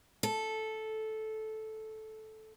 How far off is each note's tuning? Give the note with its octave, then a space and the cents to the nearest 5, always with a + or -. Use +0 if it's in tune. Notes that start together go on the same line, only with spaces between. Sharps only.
A4 -10